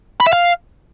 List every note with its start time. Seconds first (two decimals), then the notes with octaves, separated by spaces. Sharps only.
0.20 B5
0.27 E5
0.33 F5